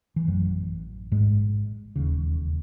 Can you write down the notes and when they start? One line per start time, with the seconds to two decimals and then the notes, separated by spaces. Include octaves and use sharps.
0.16 E3
0.27 A1 F#2 A2 F#3
1.12 G#2 G#3
1.96 E1 D#2 C#3